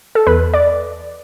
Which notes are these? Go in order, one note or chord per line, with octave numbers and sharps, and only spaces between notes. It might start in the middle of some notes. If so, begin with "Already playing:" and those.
A4
E2 B4
D5